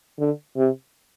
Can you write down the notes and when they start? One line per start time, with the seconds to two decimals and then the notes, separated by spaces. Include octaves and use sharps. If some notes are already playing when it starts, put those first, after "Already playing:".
0.19 D3
0.57 C3